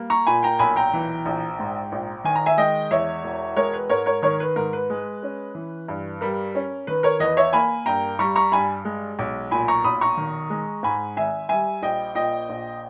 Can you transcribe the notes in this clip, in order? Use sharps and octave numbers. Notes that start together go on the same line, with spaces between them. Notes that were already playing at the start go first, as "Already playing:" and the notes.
Already playing: G3 A#3
A#5 C#6
A#2 G#5 B5
G5 A#5
B1 G#5 B5
G5 A#5
E3
A#1
G#2
A#1
D#3 G#5
A#5
E5 G#5
G#3 D#5 G5
E2 C#5 E5
E1
G#3 A#4 C#5
B4
G#2 A#4 C#5
A#4 C#5
D#3 A#4 C#5
B4
G#2 A#4
B4
G#3
C#4
E3
G2
G3 A#4
C#4
D#3 B4
A#4 C#5
E2 B4 D#5
C#5 E5
A#3 G#5 B5
G2 G5 A#5
G3 A#5 C#6
A#5 C#6
G2 G#5 B5
G#3
B1
A#2 G#5 B5
A#5 C#6
B1 B5 D#6
A#5 C#6
D#3
G#3
G#2 G#5 B5
G#1 E5 G#5
G3 E5 G#5
A#1 D#5 G5
A#2 D#5 G5
A#1